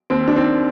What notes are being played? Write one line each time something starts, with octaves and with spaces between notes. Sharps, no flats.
D#2 C4
D4
D#3 C4